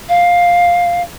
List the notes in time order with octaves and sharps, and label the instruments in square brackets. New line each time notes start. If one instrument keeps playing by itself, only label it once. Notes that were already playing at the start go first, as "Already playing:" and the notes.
[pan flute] F5